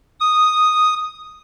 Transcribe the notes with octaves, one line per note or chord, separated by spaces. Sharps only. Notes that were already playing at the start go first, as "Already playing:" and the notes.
D#6